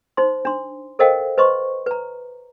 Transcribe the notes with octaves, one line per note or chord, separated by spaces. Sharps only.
D#4 C5 C6
D4 C6
A4 A#4 C5 D#5 F5 G5
B4 C5 D#5 C6 C#6
B4 A#5